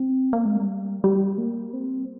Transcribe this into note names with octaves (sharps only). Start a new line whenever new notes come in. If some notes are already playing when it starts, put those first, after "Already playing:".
Already playing: C4
A#3
G#3
G3
G3
A#3
C4